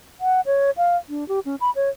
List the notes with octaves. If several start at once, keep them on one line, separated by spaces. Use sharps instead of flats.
F#5
C#5
F5
D4
G4
C#4
B5
C#5